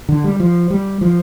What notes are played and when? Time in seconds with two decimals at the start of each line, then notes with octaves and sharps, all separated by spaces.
0.09 D3
0.24 G3
0.40 F3
0.70 G3
1.01 F3